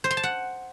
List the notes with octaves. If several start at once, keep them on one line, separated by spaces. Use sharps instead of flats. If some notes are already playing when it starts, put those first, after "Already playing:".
C5
C6
A5
F#5